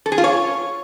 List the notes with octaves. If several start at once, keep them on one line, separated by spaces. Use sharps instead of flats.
A4
G#4
F4
C#5